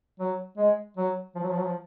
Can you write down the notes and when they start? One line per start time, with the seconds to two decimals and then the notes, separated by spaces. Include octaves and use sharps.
0.19 F#3
0.57 G#3
0.97 F#3
1.35 F3
1.43 F#3
1.51 F3
1.59 F#3
1.66 F3